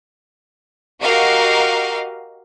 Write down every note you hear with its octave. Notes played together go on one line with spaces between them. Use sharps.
F#4 G4 A#4 D#5 F5